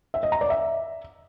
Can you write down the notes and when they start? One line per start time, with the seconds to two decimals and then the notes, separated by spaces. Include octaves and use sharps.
0.14 E5
0.23 D#5
0.32 A#5
0.41 D5
0.50 E5